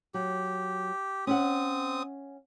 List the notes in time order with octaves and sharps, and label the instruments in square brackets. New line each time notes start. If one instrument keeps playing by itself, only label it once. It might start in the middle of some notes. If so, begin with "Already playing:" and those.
[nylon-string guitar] F#3 [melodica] G4
[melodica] C4 D#6 [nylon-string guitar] C#4 E5 F#5